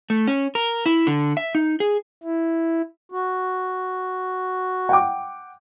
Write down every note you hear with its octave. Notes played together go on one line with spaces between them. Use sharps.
A3
C#4
A#4
E4
D3
E5
D#4
G#4
E4
F#4
F#5 G5 D6